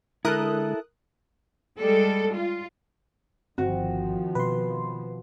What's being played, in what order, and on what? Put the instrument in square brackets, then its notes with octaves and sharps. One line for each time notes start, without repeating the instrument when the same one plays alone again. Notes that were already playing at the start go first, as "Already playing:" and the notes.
[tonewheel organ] D3 G#3 [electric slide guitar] E4 A4 [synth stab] A#4 D#6 F#6
[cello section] G3 G#3 A4
F4
[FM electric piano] G1 [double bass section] D#3 F3 [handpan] C4 [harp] F#4
[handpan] B2 [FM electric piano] B4 C6